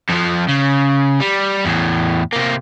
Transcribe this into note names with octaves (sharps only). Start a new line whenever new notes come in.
F2 F3
C#3
G3
E2 A2
C3 A#3